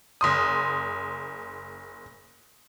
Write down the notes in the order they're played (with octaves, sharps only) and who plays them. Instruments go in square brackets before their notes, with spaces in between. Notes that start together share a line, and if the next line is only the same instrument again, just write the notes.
[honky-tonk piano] F#1 C6 D#6